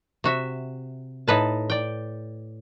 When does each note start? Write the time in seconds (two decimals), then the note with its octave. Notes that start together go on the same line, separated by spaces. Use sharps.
0.24 C3 F#4 E5
1.28 A2 D#4 B4 A5
1.70 D5 G5